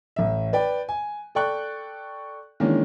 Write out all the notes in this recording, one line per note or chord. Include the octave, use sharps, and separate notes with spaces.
A1 E5
B4 D5 G5
G#5
A4 D5 G5 C#6 F#6
D#3 E3 G#3 A#3 C#4 D4